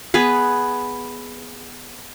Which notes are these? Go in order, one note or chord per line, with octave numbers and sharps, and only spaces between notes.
B3 G#4 B4